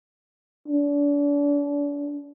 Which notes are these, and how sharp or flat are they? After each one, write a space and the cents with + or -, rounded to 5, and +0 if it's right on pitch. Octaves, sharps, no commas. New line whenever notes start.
D4 -35